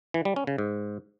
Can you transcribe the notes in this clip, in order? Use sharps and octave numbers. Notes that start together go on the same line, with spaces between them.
E3
G3
C#4
C#3
G#2